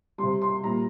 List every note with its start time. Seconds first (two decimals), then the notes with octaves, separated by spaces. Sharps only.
0.18 C3 G3 C6
0.42 C6
0.63 A#2 G3 A#5